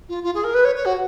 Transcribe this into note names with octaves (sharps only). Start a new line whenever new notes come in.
F4
F4
G#4
A#4
B4
C#5
C#5
F#4